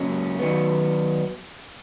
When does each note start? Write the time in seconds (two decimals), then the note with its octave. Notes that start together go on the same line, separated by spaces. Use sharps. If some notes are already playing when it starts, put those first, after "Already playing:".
Already playing: C#2 C#3 F#3 A#3 C#4
0.39 D#3 F#3 B3